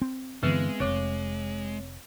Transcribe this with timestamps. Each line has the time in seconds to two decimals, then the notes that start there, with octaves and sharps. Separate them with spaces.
0.02 C4
0.43 G2 D3 E3 G#3 B3 C4 B4
0.80 F1 C4 C#5 D6